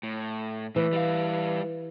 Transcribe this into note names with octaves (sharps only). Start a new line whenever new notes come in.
A2
A2 E3
G3 F5